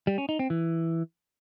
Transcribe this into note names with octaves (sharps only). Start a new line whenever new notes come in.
G3
C#4
D#4
C4
E3